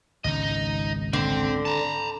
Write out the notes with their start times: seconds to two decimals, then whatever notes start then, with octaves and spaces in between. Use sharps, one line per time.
0.24 G#1 C#2 D#4 D#5
1.13 D3 C4
1.65 A5 A#5